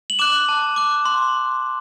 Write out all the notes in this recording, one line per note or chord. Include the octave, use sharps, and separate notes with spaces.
F#7
D6 F#6 E7
A5
D6 F#6
C6